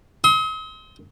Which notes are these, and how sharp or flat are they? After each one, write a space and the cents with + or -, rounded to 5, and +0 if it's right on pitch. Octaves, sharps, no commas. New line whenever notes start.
C6 +5 D#6 +45